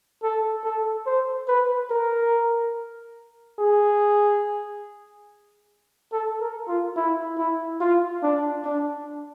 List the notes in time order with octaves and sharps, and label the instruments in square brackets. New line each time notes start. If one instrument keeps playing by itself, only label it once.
[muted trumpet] A4
A4
C5
B4
A#4
G#4
A4
A#4
F4
E4
E4
F4
D4
D4